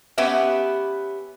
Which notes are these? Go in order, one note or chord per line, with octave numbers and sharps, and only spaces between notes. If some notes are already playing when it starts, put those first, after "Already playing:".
B3 C#4 G4 B4 E5